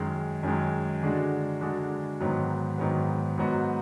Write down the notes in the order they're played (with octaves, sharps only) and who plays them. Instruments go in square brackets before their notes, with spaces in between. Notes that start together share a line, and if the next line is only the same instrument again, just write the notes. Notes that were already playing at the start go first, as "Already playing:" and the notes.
Already playing: [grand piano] F#2 D#3 G#3
F#2 D#3 G#3
D3 G#3 D4 F#4
D3 G#3 D4 F#4
G#2 D#3 F#3 B3
G#2 D#3 F#3 B3
G#2 F#3 B3 D#4 F#4